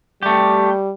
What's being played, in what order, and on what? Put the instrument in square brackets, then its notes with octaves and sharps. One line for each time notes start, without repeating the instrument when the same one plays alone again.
[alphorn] G3 [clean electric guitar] A3 G4